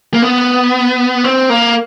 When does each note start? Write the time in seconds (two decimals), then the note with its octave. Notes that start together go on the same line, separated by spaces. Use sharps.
0.14 A#3
0.22 B3
1.24 C4
1.50 A#3